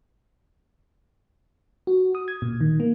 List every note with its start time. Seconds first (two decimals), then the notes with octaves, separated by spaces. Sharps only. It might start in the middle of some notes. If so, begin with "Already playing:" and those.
1.87 F#4
2.15 D#6
2.28 G#6
2.42 A#2
2.61 D#3
2.80 A#3